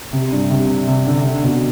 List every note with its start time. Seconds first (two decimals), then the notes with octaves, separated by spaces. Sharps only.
0.13 C3
0.32 G2
0.51 C3
0.87 C3
1.06 D3
1.25 D3
1.43 B2